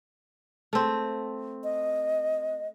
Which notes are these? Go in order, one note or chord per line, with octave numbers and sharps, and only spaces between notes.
A3 C4
D#5